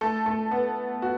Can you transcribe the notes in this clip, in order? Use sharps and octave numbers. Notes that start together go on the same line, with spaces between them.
A3 A4
A3 A4
B3
F#4